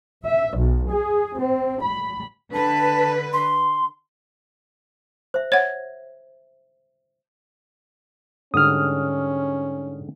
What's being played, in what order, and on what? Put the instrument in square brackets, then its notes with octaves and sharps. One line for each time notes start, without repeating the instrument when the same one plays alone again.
[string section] E5
B1
G#4
C4
B5
[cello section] D3 B4 [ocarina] A5
[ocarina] C6
[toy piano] C5 E5
[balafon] C#5 F#5 [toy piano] E5 [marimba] G#6
[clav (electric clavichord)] G#2 D3 G3 [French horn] C#4 [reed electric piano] D#6 F6